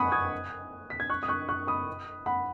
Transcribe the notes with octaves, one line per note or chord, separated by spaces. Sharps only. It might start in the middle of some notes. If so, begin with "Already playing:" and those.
Already playing: F#5 G#5 B5 C#6 D#6 F#6
D#6 G#6
B6
G#6
C#6 F#6
D#6
C#6 F#6
C#6 F#6
B5 D#6
F#5 B5